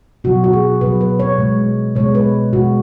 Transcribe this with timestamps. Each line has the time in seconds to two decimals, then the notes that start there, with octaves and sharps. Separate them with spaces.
0.24 B2 F#3 F#4
0.44 F#4
0.53 G#4
0.81 B2 F#3 B4
1.01 B4
1.19 C#5
1.38 B2 G#3
1.95 B2 G#3 C#5
2.15 B4
2.53 B2 G#3 F#4